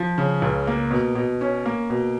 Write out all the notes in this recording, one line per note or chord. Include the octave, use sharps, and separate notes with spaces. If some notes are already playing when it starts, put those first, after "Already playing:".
Already playing: F3
C#3
C#2
A#3
B2
B2
C#4
A#3
B2